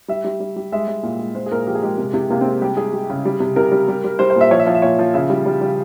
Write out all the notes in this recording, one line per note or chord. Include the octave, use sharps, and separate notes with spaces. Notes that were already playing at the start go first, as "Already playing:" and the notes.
G3 E5
G3
G3
G3
G#3 E5
G#3
A#2
G#3
A#2 C5
G#4
A#2 A#4
F3 G4
G#4
G#3 G4
C3
C3
C3 A#3
G#3 C4
G3 G4
G3 G#4
G3
C#3
G3
C3
C3 A#4
G3
G3
G3
G3 C5
C5
A#2 E5
F3 C#5
E5
F3 C#5
E5
A#2 C#5
F3
C#3 E5
G3
G3
G3